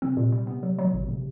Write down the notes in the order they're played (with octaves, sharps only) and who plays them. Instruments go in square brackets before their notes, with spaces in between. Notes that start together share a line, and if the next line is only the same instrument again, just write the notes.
[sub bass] C3 [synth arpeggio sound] C4
[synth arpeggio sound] A#2
G3
B3
F#3
F#3
[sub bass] C3
[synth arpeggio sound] G#1 [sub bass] B2
[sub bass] C3